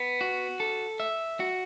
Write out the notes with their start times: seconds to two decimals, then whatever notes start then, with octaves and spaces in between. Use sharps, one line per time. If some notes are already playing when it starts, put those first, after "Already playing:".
Already playing: B3
0.21 F#4
0.60 A4
1.00 E5
1.40 F#4